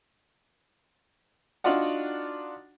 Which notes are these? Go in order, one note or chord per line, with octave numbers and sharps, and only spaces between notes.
D4 D#4 F4 F#4 D5 F#5